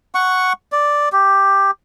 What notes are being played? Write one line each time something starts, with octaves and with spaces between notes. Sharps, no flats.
F#5 C#6
D5
G4